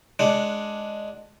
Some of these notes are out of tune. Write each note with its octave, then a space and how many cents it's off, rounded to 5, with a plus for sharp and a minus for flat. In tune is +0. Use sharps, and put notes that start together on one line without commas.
G#3 +10 D4 +0 F#5 +0